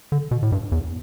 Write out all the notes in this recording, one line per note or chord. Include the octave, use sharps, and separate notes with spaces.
D3
B2
A2
G2
E2